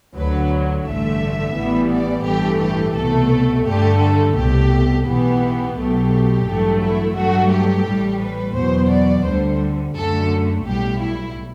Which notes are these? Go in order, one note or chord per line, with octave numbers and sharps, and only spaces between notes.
D2 D3 F#3 B4
A1 G2 D3 A3 E5
A1 A2 E3 G3 B3
D5
A1 G2 E3 A3 G4
G4
C2 B2 A3 A4
G2 D3 A3 G4
A4
C2 B2 A3 G4
B1 A2 E3 B3 G4
B1 B2 F#3 A3 G4
A1 G2 F#3 A3
E4
G2 F#3 A3 F#4
G4
A1 A2 G3
B4
E2 B2 F#3 B3 C5
D5
D2 D3 G3 C5
F#2 D3 A3 A4
B1 A2 G3 G4
E4